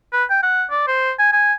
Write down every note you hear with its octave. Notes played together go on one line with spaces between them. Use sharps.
B4
G5
F#5
D5
C5
G#5
G#5